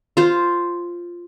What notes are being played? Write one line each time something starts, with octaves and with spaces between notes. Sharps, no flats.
F4 C5